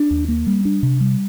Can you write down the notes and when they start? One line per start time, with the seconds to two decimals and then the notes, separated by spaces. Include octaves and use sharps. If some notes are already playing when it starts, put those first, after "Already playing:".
Already playing: D4
0.11 D#2
0.28 A#3
0.47 G3
0.65 D4
0.83 C3
1.01 G3